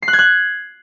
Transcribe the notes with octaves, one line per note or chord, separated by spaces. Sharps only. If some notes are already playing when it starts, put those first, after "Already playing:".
C7
F#6
G#6
F#6